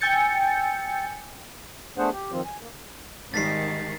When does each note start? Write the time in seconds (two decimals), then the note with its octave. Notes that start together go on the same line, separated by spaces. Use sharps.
0.01 G5 G#5 E6 G6 A6 C#7
1.98 A3 B3 D4 G#4 C5 F#5
2.13 G4
2.32 D#3 F3 C4 F4
2.45 G#5
2.59 A#3
3.34 G#1 G#2 D#3 G3 A6 B6 C7